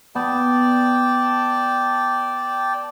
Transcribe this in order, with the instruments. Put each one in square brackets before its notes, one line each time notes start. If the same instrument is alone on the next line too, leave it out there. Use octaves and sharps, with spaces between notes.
[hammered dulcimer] B3 [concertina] D5 G5 A5